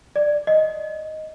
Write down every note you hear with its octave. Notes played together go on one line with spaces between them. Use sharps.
D5
D#5